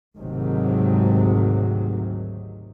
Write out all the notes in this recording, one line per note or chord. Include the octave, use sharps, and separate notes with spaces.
G#1 D2 G#2 C3 D#3 F#3